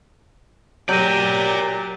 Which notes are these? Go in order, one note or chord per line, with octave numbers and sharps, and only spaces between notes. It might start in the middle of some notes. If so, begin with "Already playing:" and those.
F#3 G4 A#4 D5 A5 G6 D#7